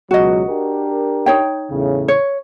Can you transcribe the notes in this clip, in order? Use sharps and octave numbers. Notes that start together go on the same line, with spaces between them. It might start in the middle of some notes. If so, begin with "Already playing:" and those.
C#2 B2 F#3 F#4 D#5
D4 G4 A#4
D#4 C#5 G5
E2 A2 C#3
C#5